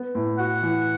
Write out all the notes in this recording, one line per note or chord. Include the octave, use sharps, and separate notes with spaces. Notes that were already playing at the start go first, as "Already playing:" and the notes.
Already playing: B3
A2
F#4 F#5
E3